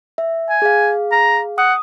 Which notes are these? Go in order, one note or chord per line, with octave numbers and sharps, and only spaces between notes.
E5
G#5
G#4 F5
A#5
F#5 D#6